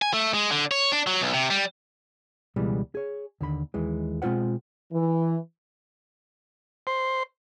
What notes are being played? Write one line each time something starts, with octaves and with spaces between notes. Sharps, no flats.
G#5
A3
G#3
D3
C#5
D4
F#3
B1
C3
G3
C#2 B2 E3 G3 G#3
G#4 C#5
D#2 D3 B5
D#2 E3 G#3
B2 G#3 C4 F4 C5 F#5
E3
C5